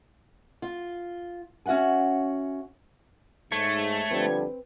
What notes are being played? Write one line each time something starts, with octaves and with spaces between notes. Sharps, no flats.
F4
C#4 F#4 E5 F#5 G#5
G#2 A3 C#5
D3 F3 G3 C4 B4